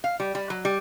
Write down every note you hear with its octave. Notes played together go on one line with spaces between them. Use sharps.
F5
G3
G3
F#3
G3